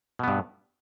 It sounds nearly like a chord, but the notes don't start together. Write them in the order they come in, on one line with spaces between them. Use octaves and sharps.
B2 B3 G2